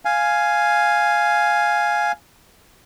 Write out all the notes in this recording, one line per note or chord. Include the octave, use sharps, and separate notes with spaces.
F5 G#5